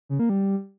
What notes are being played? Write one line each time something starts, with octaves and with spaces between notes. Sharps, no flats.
C#3
A#3
G3